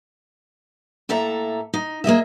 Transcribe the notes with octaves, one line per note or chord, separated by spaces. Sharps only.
A2 A#3 A4 E5 A#5
D#4
A#3 G#4 D#5 E5